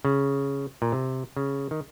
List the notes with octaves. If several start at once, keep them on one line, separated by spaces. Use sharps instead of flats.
C#3
A#2
C3
C#3
D#3